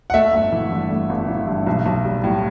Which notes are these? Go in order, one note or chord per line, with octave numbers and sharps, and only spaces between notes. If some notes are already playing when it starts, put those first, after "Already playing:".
F#5
A3 E5
G1
E3
G2
A3
G1
E3
G2
B1
B1
G3
A2